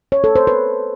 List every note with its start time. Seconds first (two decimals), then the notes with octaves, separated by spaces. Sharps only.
0.12 C#5
0.24 A4
0.36 C5
0.47 B4